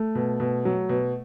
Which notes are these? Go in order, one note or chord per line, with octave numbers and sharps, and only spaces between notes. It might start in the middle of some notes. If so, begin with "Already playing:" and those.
Already playing: A3
B2
B2
F#3
B2